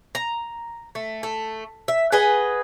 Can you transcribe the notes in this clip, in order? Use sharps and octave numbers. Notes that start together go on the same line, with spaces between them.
A#5
A3
A3
E5
G#4 B4 D#5 F#5